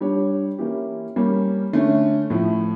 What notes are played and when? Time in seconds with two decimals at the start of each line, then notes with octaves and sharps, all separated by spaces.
0.01 G3 D4 G4 C#5
0.58 E3 A#3 C#4 E4 G4
1.16 G3 A#3 C#4
1.73 D3 A3 C#4
2.30 A2 F3 A3